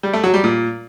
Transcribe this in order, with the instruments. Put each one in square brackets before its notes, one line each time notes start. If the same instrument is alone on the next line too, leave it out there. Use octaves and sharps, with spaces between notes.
[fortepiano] G3
A3
F#3
G3
A#2